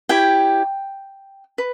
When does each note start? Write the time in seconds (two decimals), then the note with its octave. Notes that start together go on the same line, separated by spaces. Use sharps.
0.09 E4 G4 C#5 G5
1.58 B4